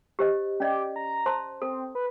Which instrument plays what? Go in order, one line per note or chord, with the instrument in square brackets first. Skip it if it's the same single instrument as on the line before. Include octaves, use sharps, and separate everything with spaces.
[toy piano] G4 C5 D#5
[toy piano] C#4 D5 D#5 [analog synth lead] G4
[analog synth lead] A#5
[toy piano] C5 A5 C6
[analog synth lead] C4 [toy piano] A4
[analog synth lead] B4